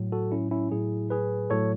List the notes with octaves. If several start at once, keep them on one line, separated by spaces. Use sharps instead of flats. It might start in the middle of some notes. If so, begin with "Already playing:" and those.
Already playing: A2 F#3
F#4 A4
C#4 E4
C#4 E4
A2 F#3 E4 G#4
G#4 B4
A2 F#3 A4 C#5